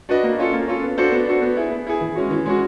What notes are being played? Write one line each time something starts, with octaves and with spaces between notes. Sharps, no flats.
D4 F#4 B4 D#5
A#3
C#4 F4 A4
A#3
C#4 F4 A4
B3
D4 F#4 A4 C5
B3
D4 F#4 A4 C5
B3
E4 G#4
B3
E4 G#4
E3
G#3 C#4 F#4
E3
G#3 C#4 F#4